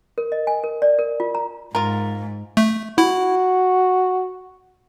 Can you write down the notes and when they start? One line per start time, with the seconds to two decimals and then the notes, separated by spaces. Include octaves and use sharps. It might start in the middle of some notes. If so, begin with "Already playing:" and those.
0.18 A#4
0.32 D#5
0.47 G#5
0.64 A#4
0.82 D5
0.99 A#4
1.20 F4
1.35 A#5
1.75 G#2 F4 A#4
2.57 A3
2.98 E4 F#4